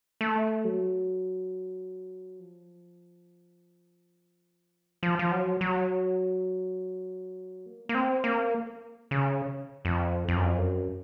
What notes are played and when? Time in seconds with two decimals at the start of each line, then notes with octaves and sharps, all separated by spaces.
0.21 A3
0.65 F#3
2.39 F3
5.03 F3
5.19 F3
5.32 F#3
5.61 F#3
7.66 A#3
7.89 A#3
7.95 C4
8.24 A#3
9.11 C#3
9.85 F2
10.29 F2
10.36 F#2
10.43 F2
10.57 F#2